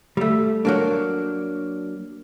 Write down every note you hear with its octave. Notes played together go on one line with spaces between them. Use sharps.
G3 A3
F#3 A#3 D4